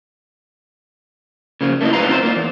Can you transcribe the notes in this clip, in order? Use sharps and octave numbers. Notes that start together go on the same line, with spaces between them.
C#3 F3 A#3
A3 A#3 D#4 E4 D#5
G#2 F4 B4 D#5 F5 A#5
C4 D#4 F4 A#4 C5
A#3 F4
E2